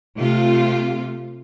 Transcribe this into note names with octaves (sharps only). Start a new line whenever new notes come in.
C3 A3 F4